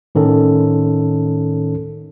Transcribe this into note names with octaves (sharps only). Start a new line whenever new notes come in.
A2 D#3 C#4 A4